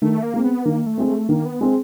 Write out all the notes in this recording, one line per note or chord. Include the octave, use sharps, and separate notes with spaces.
D#3 A3
A#3
G#3 C4
B3
D#3 A#3
A3
G#3 C4
A3
D#3 A#3
B3
G#3 C4